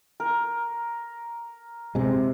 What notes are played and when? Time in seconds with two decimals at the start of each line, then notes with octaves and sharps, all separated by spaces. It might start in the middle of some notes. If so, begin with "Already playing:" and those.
0.20 A#4
1.95 C3 G#3